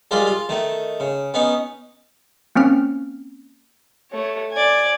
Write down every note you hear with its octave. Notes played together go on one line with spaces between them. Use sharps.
G3 G#3 F4 A#4 D5
F4
D#3 A3
C#3
B3 C#4 D#4
A#3 C4 C#4 F6
A3 C#5
D5 G#5